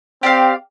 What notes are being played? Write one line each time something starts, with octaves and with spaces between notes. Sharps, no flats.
C4 G4 D5 F5